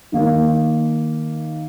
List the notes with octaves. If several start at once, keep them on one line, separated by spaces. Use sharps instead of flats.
D#3 A#3 D#4